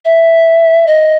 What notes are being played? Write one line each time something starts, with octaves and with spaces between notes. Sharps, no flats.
E5
D#5